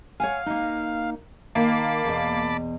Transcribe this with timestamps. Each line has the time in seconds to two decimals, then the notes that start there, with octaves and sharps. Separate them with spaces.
0.20 C#5 F5 F#5 G#5
0.46 A#3 D#4
1.55 D#3 A#3 A5 B5 D6
2.05 E2 B2